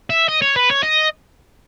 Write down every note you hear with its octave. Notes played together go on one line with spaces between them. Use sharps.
E5
D#5
C#5
B4
C#5
D#5